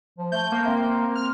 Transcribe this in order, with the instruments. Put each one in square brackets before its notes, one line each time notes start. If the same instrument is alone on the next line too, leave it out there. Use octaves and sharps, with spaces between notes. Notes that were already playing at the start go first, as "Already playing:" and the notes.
[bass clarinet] F3
[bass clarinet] A3 [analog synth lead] G6
[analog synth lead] A#3
[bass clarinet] C4
[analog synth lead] F6